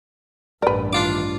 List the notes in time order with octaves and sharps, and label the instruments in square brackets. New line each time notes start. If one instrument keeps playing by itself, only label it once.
[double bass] A1 G2 [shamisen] A#4 B4 [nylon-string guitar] D5
[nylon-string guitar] D#3 E4 [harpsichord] D4 F4 D6